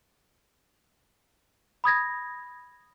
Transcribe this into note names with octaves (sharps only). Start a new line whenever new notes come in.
B5 D#6 G#6 A#6